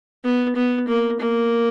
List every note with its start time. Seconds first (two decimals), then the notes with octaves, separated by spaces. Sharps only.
0.24 B3
0.56 B3
0.88 A#3
1.20 A#3